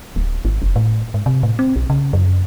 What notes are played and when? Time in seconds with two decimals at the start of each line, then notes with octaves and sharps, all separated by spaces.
0.16 D1
0.45 G#1
0.62 F1
0.76 A2
1.14 G#2
1.26 C3
1.43 A2
1.59 C4
1.76 B1
1.90 C#3
2.13 F#2